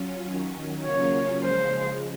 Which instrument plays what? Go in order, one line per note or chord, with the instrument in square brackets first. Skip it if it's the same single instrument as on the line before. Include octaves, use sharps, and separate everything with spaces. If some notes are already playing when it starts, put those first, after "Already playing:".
Already playing: [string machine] F#3 C#4 F4
D#3 F#3 C#4
[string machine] C#3 F#3 A#3 C#4 F4 [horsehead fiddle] C#5
[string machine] C#3 F3 G#3 [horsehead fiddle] C5